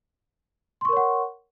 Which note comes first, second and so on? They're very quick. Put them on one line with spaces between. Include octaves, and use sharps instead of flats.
C6 C#6 A#4 C#5 F#5